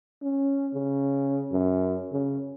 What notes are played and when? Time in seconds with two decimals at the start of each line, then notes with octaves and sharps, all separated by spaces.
0.22 C#4
0.73 C#3
1.52 F#2
2.12 C#3